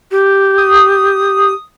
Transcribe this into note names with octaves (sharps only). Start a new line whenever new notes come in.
G4
D#6